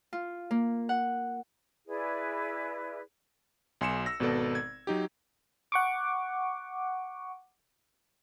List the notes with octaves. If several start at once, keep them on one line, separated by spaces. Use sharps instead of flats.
F4
A#3
F#5
E4 G#4 B4 D5
B1 G#5 C6 C#7 E7
E6 A#6
G#1 B2 B3 A4 D5
G#6
F#3 D#4 G4
F#5 C#6 D6